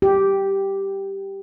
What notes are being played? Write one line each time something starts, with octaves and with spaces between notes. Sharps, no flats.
G4